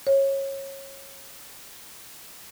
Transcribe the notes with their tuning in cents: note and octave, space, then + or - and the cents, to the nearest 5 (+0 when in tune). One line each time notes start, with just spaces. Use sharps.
C#5 -20